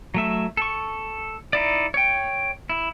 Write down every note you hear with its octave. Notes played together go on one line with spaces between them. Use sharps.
F#3 A3 E5
A4 C#6
D#4 E4 D5
C#5 G5
E4